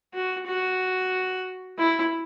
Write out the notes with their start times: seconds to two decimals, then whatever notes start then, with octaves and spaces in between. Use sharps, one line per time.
0.14 F#4
0.46 F#4
1.78 E4